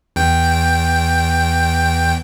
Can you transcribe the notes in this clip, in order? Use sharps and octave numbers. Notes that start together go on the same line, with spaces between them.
E2 G5